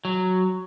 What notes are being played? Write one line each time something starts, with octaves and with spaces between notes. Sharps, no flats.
F#3